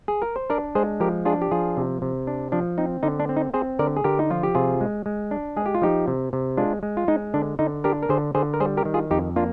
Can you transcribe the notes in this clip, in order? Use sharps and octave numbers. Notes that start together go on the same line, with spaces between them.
G#4
A#4
C5
D4 A#4 D5
G#3 G#4 C5
F3 G4 A#4
D4 F4 G#4
G4
F3 F4 G#4
C3
C3
D4
F3 D4
C4 D#4
D3 D#4
D4
C4
D#4
C4 G#4 C5
D3 A#4 D5
G#4
D3 G4 A#4
D#4
F3 F4
G4
C3 F4 G#4
G#3
G#3
D4
G#3 G#4
G4
F4
F3 D#4 G4
C3
C3
G#3 D4 F4
G#3
F4
G#3 D#4
D3 D4
D3 D#4
D4 G4 A#4
A#4
D3 G#4 C5
D3 G#4 C5
A#4
G3 G#4 C5
G4 A#4
D#3
F4 G#4
F2 D#4 G4
A#3 D4 F4